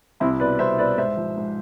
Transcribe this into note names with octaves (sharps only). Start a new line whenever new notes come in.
C2 C4 E4
B2 B4 D5
C2 C5 E5
B2 B4 D5
G#2 C5 E5
F3
G#2